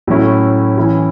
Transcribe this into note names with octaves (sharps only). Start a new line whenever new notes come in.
A2 F#3 C#4 E4
E3 C#4 E4